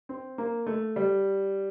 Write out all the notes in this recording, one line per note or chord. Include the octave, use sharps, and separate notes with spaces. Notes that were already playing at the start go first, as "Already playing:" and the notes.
C4
A#3
A3
G3